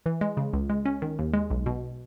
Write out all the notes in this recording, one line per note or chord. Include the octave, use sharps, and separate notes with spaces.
E3
G#3
C#3
C#2
G#3
C#4
D#3
D#2
G#3
B1
B2